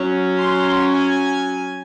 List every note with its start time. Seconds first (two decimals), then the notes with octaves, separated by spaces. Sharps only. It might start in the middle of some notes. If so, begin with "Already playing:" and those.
Already playing: F#3 C#4
0.39 C6
0.92 G#5